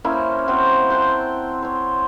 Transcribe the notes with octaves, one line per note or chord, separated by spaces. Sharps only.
A#3 C#4 E4 C5
C4 F#4 C5
C5 F#5 G5 A5
C5 C#5